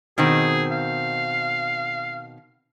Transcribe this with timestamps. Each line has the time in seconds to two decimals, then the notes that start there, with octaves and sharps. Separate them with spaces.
0.18 B2 D#3 C4 G#4
0.71 F5